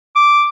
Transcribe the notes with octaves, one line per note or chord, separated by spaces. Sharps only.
D6